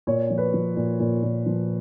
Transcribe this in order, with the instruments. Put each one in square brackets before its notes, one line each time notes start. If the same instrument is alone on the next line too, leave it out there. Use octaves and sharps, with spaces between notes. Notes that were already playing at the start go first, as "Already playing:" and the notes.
[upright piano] A#2 C#5
F3
B4
F3
A#2
A#2
A#2
F3